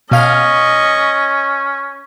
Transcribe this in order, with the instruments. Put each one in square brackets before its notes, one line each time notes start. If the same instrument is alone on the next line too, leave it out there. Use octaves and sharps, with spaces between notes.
[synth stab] B2 F5 F6 [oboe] C#4 [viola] D#5 C#6